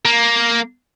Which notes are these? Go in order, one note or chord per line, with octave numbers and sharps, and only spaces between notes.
A#3